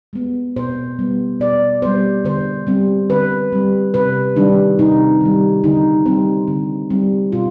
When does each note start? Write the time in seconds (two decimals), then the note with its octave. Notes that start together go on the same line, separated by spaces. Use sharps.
0.13 G#3 B3
0.56 B2 C5
0.99 G3 B3
1.40 B2 D5
1.82 G3 B3 C5
2.24 D3 C5
2.67 G3 C4
3.10 D3 B4
3.52 G3 C4
3.94 C3 B4
4.36 D#3 G3 D4
4.79 C3 D#4
5.21 D#3 G3
5.64 D3 D#4
6.06 G3 C4
6.48 D3
6.90 G3 C4
7.32 B2 F4